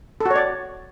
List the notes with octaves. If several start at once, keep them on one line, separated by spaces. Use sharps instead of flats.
A4
F#4
C#5
D5